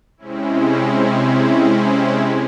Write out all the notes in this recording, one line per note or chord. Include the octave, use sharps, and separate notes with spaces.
C3 G#3 C4 C#4 E4